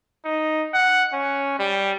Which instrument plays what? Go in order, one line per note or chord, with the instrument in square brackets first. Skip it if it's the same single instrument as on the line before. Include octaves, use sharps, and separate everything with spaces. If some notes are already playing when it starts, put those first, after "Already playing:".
[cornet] D#4
F#5
C#4
G3